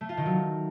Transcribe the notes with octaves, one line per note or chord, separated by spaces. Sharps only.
A3
F4
D#3
F#3